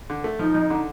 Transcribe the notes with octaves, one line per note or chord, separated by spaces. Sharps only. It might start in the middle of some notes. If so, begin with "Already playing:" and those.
D3
A3
F3 D#4
F2
D3